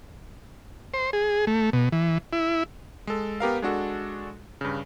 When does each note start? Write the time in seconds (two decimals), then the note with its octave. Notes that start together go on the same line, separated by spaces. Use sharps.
0.94 C5
1.13 G#4
1.47 A3
1.73 B2
1.92 E3
2.33 E4
3.07 G#3 A4
3.40 B3 G4 A#4 F5
3.62 G#3 D4 F#4 A4
4.61 G2 C#3